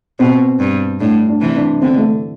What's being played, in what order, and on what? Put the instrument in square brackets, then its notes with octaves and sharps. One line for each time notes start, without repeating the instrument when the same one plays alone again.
[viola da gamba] B2 [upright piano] C4
[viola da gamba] G2
[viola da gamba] A2 [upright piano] D4
[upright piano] D4
[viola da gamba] C3 E3
[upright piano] D4
[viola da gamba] D3 [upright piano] C4
[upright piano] A3